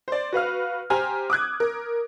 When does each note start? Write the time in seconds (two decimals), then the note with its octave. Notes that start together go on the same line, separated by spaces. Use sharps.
0.08 C5 D5
0.33 F#4 B4 F5 F6
0.90 G4 C5 G#5 A#5 F6
1.30 D6 D#6 F#6 G#6
1.60 A#4